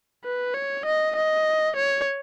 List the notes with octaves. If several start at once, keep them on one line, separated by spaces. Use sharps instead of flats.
B4
C#5
D#5
D#5
C#5